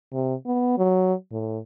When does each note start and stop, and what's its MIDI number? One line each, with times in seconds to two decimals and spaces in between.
0.13 0.34 48
0.46 0.77 59
0.78 1.13 54
1.32 1.59 45